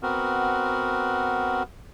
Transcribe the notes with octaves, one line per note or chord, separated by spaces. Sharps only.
B3 C4 F#4 A#4